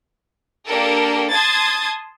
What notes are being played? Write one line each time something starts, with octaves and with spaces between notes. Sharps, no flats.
A#3 D4 G4 A4 A#4
A5 C6 D#6 G#6 A6